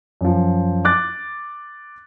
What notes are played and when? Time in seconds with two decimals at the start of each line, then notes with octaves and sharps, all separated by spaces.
0.21 F#2 F3
0.85 D6 F#6 A6